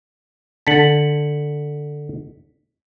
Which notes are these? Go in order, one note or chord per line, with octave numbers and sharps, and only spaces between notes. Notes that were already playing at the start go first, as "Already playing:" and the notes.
D3 A5 B6 C#7 F#7